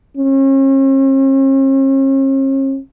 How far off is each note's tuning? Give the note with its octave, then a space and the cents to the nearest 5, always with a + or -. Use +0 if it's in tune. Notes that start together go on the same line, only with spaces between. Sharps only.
C#4 -45